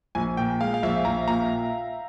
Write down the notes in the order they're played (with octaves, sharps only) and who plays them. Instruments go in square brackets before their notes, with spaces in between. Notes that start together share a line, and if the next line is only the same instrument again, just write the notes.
[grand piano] A#1 [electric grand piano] G#5
[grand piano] A#2 [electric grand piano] G5
[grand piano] G#3 [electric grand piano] F5
[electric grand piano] F5
[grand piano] A#1 [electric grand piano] E5
[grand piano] A#1 [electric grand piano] A#5
[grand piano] A#2 [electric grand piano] A#5